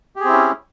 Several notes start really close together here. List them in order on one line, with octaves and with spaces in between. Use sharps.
G4 G#4 C4 E4 C#4